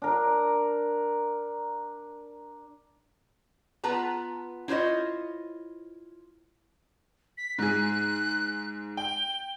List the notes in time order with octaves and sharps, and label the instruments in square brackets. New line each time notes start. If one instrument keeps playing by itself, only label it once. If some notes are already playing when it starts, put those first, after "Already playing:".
[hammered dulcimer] D4 A#4
[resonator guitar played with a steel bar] B3 F4 B4 A5 A#5
E4 F4 C5 C#5 D#5
[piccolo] B6
[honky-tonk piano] G#2 G#4 [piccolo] F#6
[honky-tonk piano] G5 [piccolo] G7